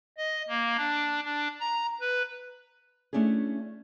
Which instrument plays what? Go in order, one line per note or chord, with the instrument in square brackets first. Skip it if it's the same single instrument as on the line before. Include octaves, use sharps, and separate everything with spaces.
[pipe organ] D#5
A#3
D4
D4
A#5
B4
[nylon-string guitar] A3 C#4 D4 E4 G#4